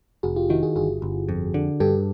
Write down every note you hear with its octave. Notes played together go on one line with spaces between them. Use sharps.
F1 F#4 G#4
F4 G4
D#3 E4 F#4
F#4 G#4
G1 F#4 G#4
G1
F2
D3
G2 G4 A4